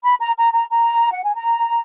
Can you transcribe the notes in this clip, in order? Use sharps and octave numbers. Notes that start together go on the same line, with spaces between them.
B5
A#5
A#5
A#5
A#5
F#5
G#5
A#5